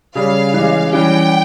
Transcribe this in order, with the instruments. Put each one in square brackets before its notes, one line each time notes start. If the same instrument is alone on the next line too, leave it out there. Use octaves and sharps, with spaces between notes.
[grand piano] C#3 G3 C#4 [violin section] F5
[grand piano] E3 G#3 C#4 G4
[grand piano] E3 G3 C#4 G4 [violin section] G5